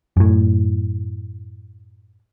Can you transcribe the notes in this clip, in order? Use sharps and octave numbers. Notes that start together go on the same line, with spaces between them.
F#2 A2